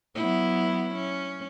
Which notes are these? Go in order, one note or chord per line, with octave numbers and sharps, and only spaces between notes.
F#3 B3 E4
C#4